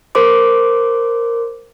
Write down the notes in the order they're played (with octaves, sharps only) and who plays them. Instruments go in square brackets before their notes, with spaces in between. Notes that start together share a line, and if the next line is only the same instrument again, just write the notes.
[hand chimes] A#4 C5 C6 D6